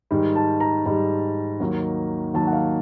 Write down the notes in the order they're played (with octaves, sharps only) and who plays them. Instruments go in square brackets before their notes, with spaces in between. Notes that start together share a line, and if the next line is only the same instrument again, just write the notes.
[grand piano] G#2 D#3 G3
A5
A#5
G#2 D#3 G3
D#2 D#3 F#3 A#3
D#2 D#3 F#3 A#3 A5
F#5
F5